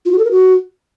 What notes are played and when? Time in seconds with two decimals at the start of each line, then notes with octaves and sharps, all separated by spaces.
0.05 F4
0.12 F#4
0.18 A4
0.25 A#4
0.31 F#4